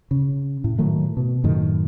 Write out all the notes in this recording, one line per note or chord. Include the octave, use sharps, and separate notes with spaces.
C#3
A2
A2 D#3 F#3 A3
B2
F#2 A2 D#3